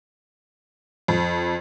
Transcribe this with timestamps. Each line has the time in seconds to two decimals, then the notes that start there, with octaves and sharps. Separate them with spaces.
1.08 F2